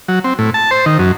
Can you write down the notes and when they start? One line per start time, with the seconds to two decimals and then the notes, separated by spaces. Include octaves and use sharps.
0.08 F#3
0.24 C4
0.39 A2
0.54 A5
0.71 C5
0.86 D#3
0.99 F#2